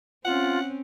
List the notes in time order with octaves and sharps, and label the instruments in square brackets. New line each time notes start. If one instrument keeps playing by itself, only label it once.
[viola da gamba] C4 C#4 [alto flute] F4 [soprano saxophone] F#5